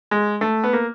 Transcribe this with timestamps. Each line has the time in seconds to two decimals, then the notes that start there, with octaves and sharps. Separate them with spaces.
0.11 G#3
0.41 A3
0.64 B3
0.73 A#3